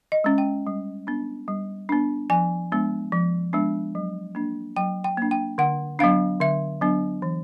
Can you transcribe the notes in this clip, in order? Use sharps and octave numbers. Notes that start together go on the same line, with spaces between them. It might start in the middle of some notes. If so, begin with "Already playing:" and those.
D#5
G#3 C#4
G5
G3
B3 D4
G3
B3 D4
F3 G#5
G#3 B3 D4
F3
G#3 B3 D4
F#3
A#3 D4
F#3 G5
G5
A#3 D4
G5
D3 F#5
F#3 B3 D4 F5
D3 E5
F#3 B3 D4
E3